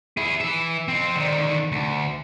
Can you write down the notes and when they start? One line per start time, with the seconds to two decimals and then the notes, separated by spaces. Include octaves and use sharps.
0.17 E4 G#4
0.41 E3 E5
0.88 F2 C4
1.16 D3 D#3
1.72 D2